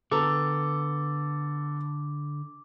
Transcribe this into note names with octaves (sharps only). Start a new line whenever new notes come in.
D3 B3 A4 A#5 D6